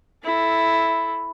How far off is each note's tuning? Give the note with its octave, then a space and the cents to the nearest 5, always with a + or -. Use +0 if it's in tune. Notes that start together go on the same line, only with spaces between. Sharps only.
E4 +0 A4 -10